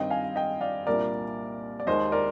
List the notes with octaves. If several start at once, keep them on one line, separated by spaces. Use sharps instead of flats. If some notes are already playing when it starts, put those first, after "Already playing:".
Already playing: G2 D#3 G3 C4 D#5 G5
F5 G#5
D#5 G5
D5 F5
C2 A#2 G3 D4 A#4 D5
D5
D#2 D#3 G#3 C5 D#5
A#4 D5